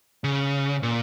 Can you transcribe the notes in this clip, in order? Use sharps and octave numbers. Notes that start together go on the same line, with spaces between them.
C#3
A#2